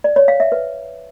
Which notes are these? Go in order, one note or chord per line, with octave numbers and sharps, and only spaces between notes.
D5
C#5
F5
E5
B4